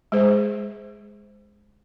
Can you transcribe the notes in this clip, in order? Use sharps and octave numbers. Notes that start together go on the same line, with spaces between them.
G#3 G#4 C5